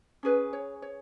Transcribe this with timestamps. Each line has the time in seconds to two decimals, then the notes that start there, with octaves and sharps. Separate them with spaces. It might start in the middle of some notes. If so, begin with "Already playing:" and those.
0.23 C#4 G#4 B4
0.53 C#5
0.82 C#5